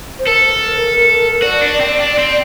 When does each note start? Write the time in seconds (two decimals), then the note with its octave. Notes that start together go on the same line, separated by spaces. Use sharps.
0.19 C5
0.27 A4 A#4
1.42 F#4 D5
1.61 D4
1.80 C4
2.00 D4
2.19 C4